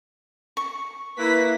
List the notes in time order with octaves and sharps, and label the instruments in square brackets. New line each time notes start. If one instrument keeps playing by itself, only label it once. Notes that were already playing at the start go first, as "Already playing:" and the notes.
[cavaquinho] C#6
[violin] A#3 B6 [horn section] E4 B4